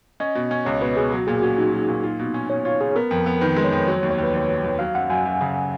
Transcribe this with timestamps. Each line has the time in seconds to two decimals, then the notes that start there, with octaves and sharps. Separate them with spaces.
0.20 C#4 D#5
0.35 B2
0.51 C#4
0.65 C#2 C#5
0.81 B2 B4
0.97 B2 G#4
1.11 F#3 F#4
1.27 A#2 G#4
1.42 C#4 F#4
1.58 F#3 D#4
1.73 F#3
1.88 A#2
2.03 F4
2.19 B2
2.34 C#4
2.50 B2 C#5
2.65 F4 C#5
2.80 F4 G#4
2.96 B3 A#4
3.11 F2
3.26 B3
3.41 D#3 B4
3.56 G#3
3.64 C#5
3.72 F2
3.87 F#3 C#5
4.03 D#2
4.11 C#5
4.18 D#2 B4
4.33 D#2 C#5
4.49 F#3
4.64 D#2
4.79 F#3 F5
4.95 F#2 F#5
5.10 F#2 G#5
5.25 F#2
5.41 C#3